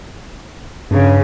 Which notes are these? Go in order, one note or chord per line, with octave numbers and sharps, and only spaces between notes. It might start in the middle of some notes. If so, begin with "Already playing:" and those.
G2 C#3